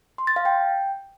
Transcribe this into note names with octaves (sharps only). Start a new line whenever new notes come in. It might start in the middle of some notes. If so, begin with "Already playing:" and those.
C6
A6
F5
G5